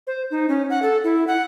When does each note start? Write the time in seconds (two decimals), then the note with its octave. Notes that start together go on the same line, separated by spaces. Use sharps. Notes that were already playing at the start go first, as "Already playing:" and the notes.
0.07 C5
0.31 D#4
0.49 C#4
0.70 F#5
0.82 A4
1.04 E4
1.27 F#5